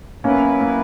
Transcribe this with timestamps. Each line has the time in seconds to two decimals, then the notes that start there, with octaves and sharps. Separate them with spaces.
0.24 F#3 A#3 B3 C#4 E4 B4
0.61 A#3